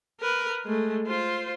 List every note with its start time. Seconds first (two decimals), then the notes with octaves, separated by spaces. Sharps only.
0.21 A#4 B4
0.65 G#3 A3
1.07 F4 C5